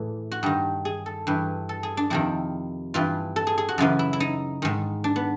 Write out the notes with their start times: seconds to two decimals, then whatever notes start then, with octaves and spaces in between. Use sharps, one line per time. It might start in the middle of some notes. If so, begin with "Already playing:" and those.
Already playing: A2 E3 G#4
0.32 F#4
0.43 G2 D#3 G4
0.85 G#4
1.06 A4
1.27 G2 E3
1.69 A4
1.83 G#4
1.97 D4
2.10 F2 C3 D#3 E4
2.94 G2 E3 F4
3.36 A4
3.47 G#4
3.58 G#4
3.69 F#4
3.78 F#2 C#3 E3 F4
3.99 E4
4.13 E4
4.20 D#4
4.62 G#2 D#3
5.04 D4
5.16 B3